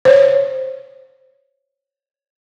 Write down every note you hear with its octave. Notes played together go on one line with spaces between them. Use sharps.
C5 C#5